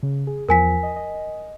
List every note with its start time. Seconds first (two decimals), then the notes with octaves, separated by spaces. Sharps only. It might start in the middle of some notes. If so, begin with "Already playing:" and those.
0.03 C#3
0.27 G#4
0.49 E2 F3 A#4 G#5 B6
0.83 D#5
0.96 D#5